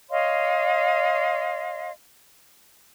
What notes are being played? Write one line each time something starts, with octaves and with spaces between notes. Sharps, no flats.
C#5 D#5 F5 C6